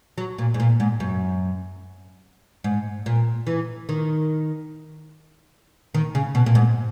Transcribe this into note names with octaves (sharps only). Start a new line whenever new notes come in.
F#3
A#2
G#2
A#2
G#2
F#2
G#2
A#2
E3
D#3
D#3
C#3
B2
A#2
G#2